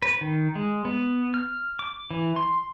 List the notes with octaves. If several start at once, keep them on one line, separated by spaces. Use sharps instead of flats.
B4
D#3
G#3
B3
F6
D6
E3
C6